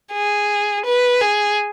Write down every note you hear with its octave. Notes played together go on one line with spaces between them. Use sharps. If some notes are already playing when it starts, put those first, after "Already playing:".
G#4
B4
G#4